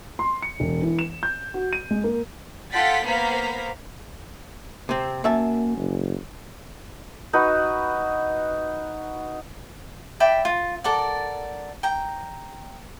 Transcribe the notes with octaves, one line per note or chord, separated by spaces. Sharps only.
C6
C#7
E1
E3
E7
G6
F#4
D#7
G#3
A#3
F4 A4 F#5 G5 A6 B6
A#3 B3 C5 F5 A#5 B6
C3 C4
F#2 A#3 E5 A5
F#1
D#4 F#4 B4
D5 E5 G5 B5
F4
A4 A#4 D5 F#5
G5 A#5